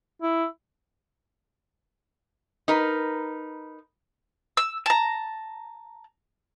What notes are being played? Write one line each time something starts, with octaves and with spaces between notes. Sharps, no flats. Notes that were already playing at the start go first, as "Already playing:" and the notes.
E4
D#4 A#4 B4
E6
A5 A#5